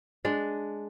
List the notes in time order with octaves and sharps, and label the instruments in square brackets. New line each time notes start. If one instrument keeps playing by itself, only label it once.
[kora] G#3 D4